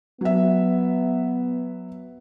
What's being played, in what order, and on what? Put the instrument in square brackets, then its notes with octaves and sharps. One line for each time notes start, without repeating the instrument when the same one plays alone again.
[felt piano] F#3 E5 [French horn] B3